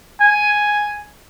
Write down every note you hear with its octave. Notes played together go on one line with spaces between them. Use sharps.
G#5